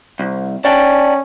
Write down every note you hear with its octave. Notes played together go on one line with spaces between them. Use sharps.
C2
C#4 D5 G5 A5